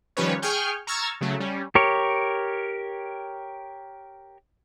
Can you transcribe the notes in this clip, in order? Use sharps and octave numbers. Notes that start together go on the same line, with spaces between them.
D#3 F3 G3 C#4 B4 C#5
G#4 G5 G#5 C#6 F6 G6
A#5 C#6 E6 F6 G#6 A6
C#3 F#3 A3
G3 C#4
G4 A#4 C#5